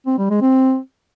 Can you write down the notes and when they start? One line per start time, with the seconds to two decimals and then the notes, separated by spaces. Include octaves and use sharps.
0.06 C4
0.18 G3
0.30 G#3
0.42 C4